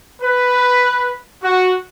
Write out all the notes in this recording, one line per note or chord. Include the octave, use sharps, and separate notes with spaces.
B4
F#4